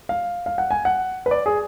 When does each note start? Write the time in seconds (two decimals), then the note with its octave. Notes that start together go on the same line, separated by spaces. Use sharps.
0.09 F5
0.46 F5
0.58 F#5
0.71 G#5
0.85 F#5
1.26 B4
1.31 D5
1.46 G#4